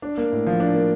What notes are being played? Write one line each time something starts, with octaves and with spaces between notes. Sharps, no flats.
D4
A#3
A2
F3
D4
A#3